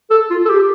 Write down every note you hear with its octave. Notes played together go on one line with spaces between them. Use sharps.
A4
F4
A4
G4